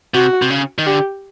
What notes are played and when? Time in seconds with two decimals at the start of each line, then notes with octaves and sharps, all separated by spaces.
0.14 C3 F#4
0.42 C3
0.50 C#3
0.78 D#3
0.86 D3 G4